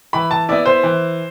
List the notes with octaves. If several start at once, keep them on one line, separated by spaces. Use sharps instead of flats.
E3 B5
A5
B3 E4 D5
C5
E3